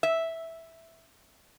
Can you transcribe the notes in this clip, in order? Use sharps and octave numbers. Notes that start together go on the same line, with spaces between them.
E5